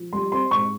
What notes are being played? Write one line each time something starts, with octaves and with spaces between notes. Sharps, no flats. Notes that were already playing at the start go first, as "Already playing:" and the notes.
Already playing: F3
G3 C6
C4 C6
G#2 C#6